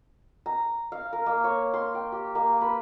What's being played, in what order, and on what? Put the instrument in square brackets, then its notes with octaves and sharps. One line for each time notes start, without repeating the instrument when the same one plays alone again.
[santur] A#5
F5
A#4
A#3
C#5
C6
G5
G4
A#3
B4